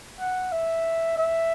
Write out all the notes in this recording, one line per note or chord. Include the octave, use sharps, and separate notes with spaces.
F#5
E5
E5